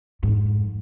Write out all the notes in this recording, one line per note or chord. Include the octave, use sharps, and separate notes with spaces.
F2 G#2